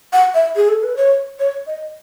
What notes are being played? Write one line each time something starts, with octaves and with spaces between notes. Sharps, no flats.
F#5
E5
G#4
A4
B4
C#5
C#5
D#5